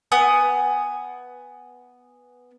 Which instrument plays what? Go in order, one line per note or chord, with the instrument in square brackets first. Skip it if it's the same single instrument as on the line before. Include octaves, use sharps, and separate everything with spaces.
[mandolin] B3 G#5 D#6